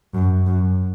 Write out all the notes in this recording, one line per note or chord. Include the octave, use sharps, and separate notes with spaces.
F#2
F#2